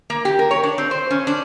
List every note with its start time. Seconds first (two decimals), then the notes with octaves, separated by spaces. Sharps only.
0.10 A#3
0.25 G4
0.39 A#4
0.51 C#5
0.63 D4
0.78 C4
0.91 C5
1.10 C#4
1.27 D4